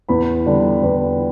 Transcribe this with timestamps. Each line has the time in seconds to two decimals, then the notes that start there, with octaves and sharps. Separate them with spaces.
0.09 E2 B5
0.46 D3 G3 D4
0.83 E2